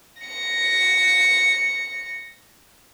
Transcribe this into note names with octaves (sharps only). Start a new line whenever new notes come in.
A#6 C#7